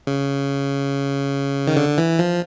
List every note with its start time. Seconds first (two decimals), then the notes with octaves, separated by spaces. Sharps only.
0.07 C#3
1.67 D#3
1.77 D3
1.98 E3
2.19 F3